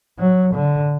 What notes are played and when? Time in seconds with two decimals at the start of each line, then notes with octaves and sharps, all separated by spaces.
0.19 F#3
0.54 D3